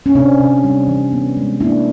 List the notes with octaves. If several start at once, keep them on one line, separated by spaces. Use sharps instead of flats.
C#4
C3 C4 D4
C3
G3
E3
B3
G#3
A#3 D4 E4